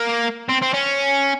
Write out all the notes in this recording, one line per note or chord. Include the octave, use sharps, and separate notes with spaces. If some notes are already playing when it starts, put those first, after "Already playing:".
Already playing: A#3
C4
C4
C#4